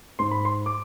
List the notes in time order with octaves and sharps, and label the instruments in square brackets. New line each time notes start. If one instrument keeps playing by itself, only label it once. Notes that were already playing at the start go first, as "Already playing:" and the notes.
[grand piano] G#2 C6
B5
C6
D6